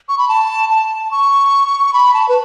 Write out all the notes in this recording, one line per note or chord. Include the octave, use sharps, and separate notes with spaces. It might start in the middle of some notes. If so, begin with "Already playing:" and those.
C#6
B5
A5
A5
C#6
B5
A5
B4